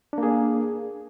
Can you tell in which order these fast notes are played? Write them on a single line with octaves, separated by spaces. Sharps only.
D4 A#3 G#4